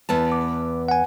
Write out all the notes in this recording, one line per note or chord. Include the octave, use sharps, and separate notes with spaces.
E2 B3 A5
D6
F#5 G#5